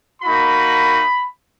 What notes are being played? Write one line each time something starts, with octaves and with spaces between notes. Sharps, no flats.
A#3 D#4 F#4 B5